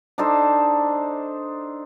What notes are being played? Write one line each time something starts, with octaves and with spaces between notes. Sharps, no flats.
D4 D#4 A4 C5